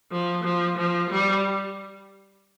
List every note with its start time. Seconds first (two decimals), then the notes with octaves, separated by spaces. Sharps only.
0.12 F3
0.44 F3
0.77 F3
1.10 G3